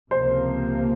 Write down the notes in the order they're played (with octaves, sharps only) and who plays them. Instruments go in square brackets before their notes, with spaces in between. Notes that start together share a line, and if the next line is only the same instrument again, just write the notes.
[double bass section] C#2 C3 F3 A#3 [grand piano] C5